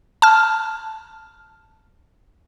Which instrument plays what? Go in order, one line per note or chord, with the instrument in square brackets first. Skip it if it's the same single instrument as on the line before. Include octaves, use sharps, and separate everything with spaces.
[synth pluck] A5 F6